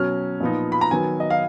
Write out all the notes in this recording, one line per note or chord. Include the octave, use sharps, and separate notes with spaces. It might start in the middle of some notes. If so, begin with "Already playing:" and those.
Already playing: B2 F#3 C#4 F6
A#2 F3 B3 D#4
B5
A#5
D#3 F#3 B3 G#5
D#5
F5